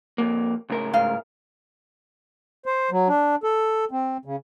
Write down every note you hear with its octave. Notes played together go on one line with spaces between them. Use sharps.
F2 A#3
C#2 A2 A#4
G#2 F5
C5
F#3
D4
A4
C4
C#3